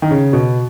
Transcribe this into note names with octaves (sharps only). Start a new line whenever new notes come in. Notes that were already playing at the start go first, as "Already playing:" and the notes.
D#3
C#3
B2